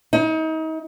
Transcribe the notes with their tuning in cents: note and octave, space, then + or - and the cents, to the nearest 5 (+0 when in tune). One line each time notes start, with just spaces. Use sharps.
D#4 +35